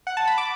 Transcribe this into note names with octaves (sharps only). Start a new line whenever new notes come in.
F#5
A5
B5
D6